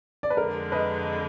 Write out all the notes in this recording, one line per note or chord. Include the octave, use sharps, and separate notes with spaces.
D5
B4
F2 D3 G#3 A#4
B4 D#5